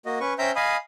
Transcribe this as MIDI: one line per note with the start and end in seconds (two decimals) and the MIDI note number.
0.06 0.19 58
0.06 0.19 66
0.06 0.19 75
0.20 0.33 61
0.20 0.33 71
0.20 0.33 85
0.39 0.51 61
0.39 0.51 72
0.39 0.51 76
0.39 0.51 79
0.39 0.51 82
0.39 0.51 91
0.56 0.77 75
0.56 0.77 77
0.56 0.77 80
0.56 0.77 83
0.56 0.77 87